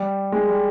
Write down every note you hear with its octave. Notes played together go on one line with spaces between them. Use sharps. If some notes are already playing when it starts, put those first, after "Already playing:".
Already playing: G3
G#3
G3